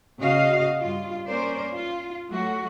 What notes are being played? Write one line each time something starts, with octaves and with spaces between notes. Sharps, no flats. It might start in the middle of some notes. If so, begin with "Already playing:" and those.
C#3 F#4 D#5 F5
G2 F4
A#3 C#4 A#4 C5 D5
F4
F#3 A3 F#4